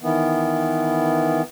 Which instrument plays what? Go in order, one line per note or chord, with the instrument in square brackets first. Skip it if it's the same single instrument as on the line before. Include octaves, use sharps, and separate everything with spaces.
[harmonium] D#3 E3 B3